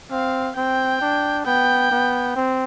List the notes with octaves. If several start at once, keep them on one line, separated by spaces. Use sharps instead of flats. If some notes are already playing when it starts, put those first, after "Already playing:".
C4 F5
C4 G5
D4
B3 G5
B3
C4